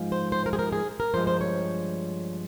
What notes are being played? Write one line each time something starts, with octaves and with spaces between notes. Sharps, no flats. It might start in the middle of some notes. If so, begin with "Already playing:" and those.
Already playing: G#2 F3 G#3
C5
C5
A#4
G#4
A#4
G#4
A#4
G2 F3 G#3 C5
C5
C#5